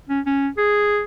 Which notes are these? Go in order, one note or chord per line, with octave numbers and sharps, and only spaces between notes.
C#4
C#4
G#4